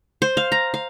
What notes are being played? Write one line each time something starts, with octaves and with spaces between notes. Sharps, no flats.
C5
F5
A#5
F5